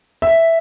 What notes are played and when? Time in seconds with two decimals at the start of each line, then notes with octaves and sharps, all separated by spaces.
0.22 E5